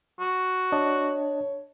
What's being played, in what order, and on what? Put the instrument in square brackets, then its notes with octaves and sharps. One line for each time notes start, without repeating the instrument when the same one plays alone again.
[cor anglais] F#4
[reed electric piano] D4 D#5 A5 [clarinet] C#5